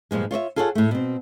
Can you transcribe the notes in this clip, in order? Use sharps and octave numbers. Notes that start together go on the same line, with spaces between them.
G2 A#2 F3 G#3
F4 C#5 D5 E5
F4 G#4 A4 C#5 F5 F#5
A2 A3
B2 C4